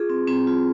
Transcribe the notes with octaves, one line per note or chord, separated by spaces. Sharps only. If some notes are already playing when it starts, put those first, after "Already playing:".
Already playing: F4 G#4
C4
C4
F4